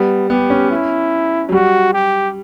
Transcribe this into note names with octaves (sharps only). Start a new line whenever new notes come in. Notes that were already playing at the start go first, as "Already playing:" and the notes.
Already playing: G3 B3
B3 G4
C#4
E4
F#3
G3 F#4
G4